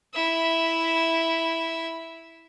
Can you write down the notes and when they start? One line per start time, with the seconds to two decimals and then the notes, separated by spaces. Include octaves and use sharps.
0.14 E4 E5